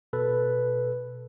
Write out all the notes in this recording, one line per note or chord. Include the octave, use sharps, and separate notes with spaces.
B2 A4 B4